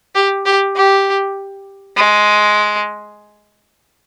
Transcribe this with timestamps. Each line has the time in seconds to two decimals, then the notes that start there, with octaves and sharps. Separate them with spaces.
0.15 G4
0.45 G4
0.76 G4
1.96 G#3